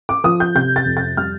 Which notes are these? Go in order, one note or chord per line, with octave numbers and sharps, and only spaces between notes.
D6
F3 D#6
G6
C3 G6
A6
F2
A6
G3 F6